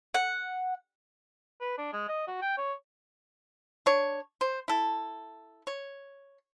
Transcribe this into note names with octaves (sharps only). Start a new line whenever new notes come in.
F#5
B4
D4
G#3
D#5
F#4
G5
C#5
D4 C#5
C5
E4 A4
C#5